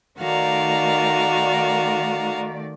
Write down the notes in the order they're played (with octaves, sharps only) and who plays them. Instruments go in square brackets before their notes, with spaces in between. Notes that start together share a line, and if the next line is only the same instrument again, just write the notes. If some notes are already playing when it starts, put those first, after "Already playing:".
[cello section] D#3 A3 D5 [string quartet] F#4 F5 A#5